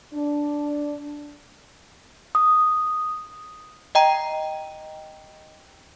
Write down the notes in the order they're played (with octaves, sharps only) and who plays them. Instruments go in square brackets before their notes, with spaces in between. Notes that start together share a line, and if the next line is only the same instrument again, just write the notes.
[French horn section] D4
[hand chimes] D#6
[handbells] D#5 G5 A#5